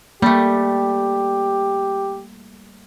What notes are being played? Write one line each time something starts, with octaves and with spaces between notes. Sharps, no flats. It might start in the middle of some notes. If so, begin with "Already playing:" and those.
G3 A3 A#3 G4